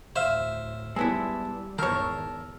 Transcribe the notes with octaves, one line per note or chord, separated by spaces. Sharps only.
D2 A2 C5 E5 F5
G3 G#3 B3 E4 A5 E6
G#1 E2 D#3 A#4 C#5 A5 E6